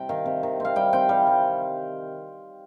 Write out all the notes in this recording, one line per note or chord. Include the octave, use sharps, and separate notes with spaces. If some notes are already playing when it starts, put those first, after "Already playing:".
Already playing: C3 G3 G5
D#3 F5
C3
D#3
C4 F5
G3 G5
C4 G5
G3 F5
G3